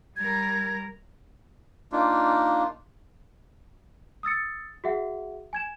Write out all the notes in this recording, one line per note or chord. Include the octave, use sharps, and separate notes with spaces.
G3 A#4 G#6
A#3 D4 D#4 F4
D#6 E6 A6 C#7
F#4 G#4 E5 F#5
G#5 G#6 E7